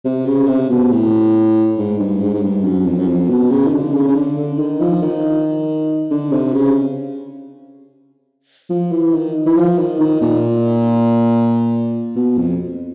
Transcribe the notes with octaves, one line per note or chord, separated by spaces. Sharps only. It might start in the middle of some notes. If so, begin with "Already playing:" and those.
C3
C#3
C3
B2
A2
G#2
G2
G#2
G#2
G2
F#2
F2
F#2
F2
B2
C#3
D#3
D3
C#3
C#3
D3
D3
D#3
F3
D#3
D3
C3
C#3
F3
E3
D#3
E3
F3
D#3
D#3
A#2
B2
F2